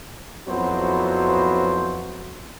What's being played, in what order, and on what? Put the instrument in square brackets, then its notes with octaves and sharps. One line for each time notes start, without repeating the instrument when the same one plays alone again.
[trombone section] F2 F#3 B3 E4 F#4 C5